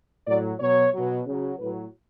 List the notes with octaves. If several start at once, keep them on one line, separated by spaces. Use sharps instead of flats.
A2 F#3 D5
B2 F#3 C#5
B2 F#3
C#3 F#3
A2 F#3 B4